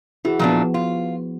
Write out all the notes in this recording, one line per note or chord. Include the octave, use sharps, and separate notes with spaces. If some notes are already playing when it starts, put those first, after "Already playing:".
E3 E4 F#4 G#4
A#2 E3 F3 B3 D4
F4